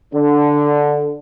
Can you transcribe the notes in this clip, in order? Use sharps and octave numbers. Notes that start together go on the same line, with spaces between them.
D3